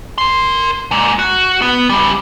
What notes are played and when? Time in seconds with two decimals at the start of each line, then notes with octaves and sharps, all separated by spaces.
0.18 A#4 C6
0.91 G#3 A#3
1.19 F#4
1.62 B3
1.89 C#3 G3